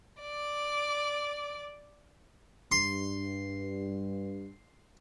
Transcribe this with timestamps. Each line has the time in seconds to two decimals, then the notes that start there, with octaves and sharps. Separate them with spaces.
0.22 D5 D6
2.72 G2 C6